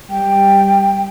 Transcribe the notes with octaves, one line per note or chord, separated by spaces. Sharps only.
G3 G5